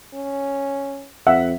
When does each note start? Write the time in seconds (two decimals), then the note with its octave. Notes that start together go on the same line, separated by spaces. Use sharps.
0.14 C#4
1.27 F2 E5 F#5